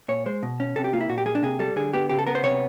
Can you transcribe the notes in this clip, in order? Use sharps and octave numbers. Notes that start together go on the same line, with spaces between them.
A#2 C#5
G#3 C5
B2
C#4
C3 A4
G4
A#3 F4
E4
A#2 F#4
G4
A#3 G#4
D4
C3 G#4
G3 A4
D3 G#4
B3 G4
C#3 G4
A4
B3 A#4
C5
C3 C#5